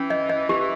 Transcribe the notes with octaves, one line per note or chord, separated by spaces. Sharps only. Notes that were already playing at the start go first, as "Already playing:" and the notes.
Already playing: E3 C#4
D#5
D#5
E3 G4